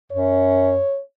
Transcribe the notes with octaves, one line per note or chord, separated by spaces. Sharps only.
F#2 C#5